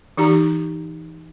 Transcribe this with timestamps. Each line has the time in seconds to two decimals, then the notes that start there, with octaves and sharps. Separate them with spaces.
0.17 E3 D#4 G4 A#5